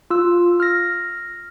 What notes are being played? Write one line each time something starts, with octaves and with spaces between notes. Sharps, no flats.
F4 E6
F6 A#6